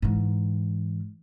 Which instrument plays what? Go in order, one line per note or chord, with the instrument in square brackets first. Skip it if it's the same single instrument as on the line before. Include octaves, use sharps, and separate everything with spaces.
[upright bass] G#2 E3